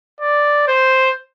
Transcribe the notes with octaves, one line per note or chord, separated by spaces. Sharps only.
D5
C5